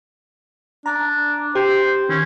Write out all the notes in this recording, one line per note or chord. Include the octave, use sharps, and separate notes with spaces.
D4 A#5
G4 C5
D#3 C#4